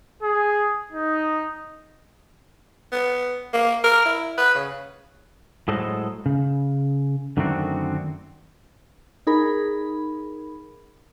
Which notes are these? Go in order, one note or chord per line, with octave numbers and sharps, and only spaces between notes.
G#4
D#4
B3
A#3
A#4
E4
B4
C#3
A2 F#3 G#3 A4 C5 D#5
C#3
F#2 D3 D#3 A3 C4 F#4
D#4 G#4 A#4 B5